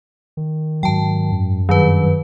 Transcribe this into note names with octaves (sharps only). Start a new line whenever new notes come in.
D#3
G#2 F#3 G5 A5
F#2
G2 D#3 F#3 B4